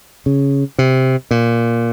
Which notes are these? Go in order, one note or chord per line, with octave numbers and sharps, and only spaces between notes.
C#3
C3
A#2